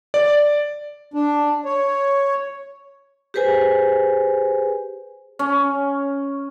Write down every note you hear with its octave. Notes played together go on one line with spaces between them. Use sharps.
D5
D4
C#5
G4 G#4 B4 C5 G#5
C#4